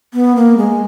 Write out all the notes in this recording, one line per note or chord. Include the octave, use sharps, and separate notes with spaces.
B3
A#3
G#3